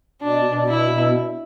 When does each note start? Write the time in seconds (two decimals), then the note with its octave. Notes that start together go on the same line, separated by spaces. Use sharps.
0.22 B2 D4
0.45 B2
0.67 B2 E4
0.90 B2